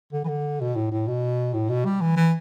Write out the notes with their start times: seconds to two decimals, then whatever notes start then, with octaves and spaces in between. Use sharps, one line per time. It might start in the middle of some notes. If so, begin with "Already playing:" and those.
0.13 D3
0.24 E3
0.28 D3
0.61 B2
0.75 A2
0.91 A2
1.07 B2
1.54 A2
1.69 B2
1.85 G3
2.01 E3
2.16 E3